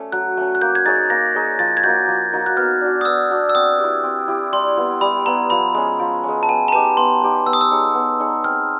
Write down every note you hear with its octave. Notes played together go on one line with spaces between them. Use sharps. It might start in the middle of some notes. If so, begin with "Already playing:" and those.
Already playing: A3 C#4
F#3 F#6
A3 C#4
F#6
A#3 G6
G#6
D#4 G#4 C#5 A6
A#3 A#6
D#4 G#4 C#5
F3 A6
G#6
A#3 D#4 F#4 G6
F3
A#3 D#4 F#4
F#6
B3 F6
D4 F#4
D#6
B3 E6
D4 F#4
E6
C4 D#6
E4 G4
C4
E4 G4
G3 C6
B3 E4
G3 B5
B3 E4 A#5
F3 B5
G#3 C#4
F3
G#3 C#4
A5
B3 G#5
A#5
D#4 G4 B4 A5
B3 C6
D#4 G4 B4
B3 E6
D#6
E6
D#4 G#4 C#5
B3
D#4 G#4 C#5
C4 F6